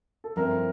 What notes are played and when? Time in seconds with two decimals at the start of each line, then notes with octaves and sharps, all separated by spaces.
0.24 A4
0.36 G2 F3 C4 E4 A#4